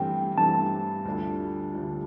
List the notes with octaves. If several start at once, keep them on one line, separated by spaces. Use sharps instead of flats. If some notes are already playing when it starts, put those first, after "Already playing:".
Already playing: G2 E3 A3 C4 G4 G5
G2 E3 A3 C4 G4 A5
D2 D3 G3 D4 F4
D2 D3 G3 D4 F4